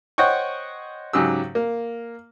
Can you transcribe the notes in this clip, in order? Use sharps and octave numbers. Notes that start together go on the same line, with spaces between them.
C5 C#5 D#5 F#5 G5 C#6
G#2 C#3 F#3 G4 E6
A#3